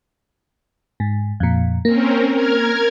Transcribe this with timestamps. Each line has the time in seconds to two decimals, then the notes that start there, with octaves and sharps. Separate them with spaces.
1.00 G#2
1.40 F2 A#2
1.85 A#3 C4 C#4 A#4
2.31 A#4 F6 G#6